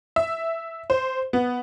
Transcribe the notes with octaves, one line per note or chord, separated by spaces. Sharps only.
E5
C5
B3